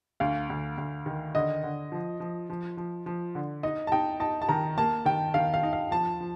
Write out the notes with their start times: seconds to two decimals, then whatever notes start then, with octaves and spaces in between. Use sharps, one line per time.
0.20 D2 F5
0.50 D2
0.78 D2
1.06 D#3
1.35 D3 D#5
1.63 D3
1.92 F3
2.20 F3
2.50 F3
2.77 F3
3.06 F3
3.35 D3
3.63 D#4 D#5
3.87 A5
3.92 D#4 G5
4.20 D#4 A5
4.42 A5
4.49 D#3 A#5
4.78 A#3 A5
5.05 D#3 G5
5.34 D#3 F5
5.54 F5
5.63 D#4
5.73 F5
5.91 F3 A5
6.20 F3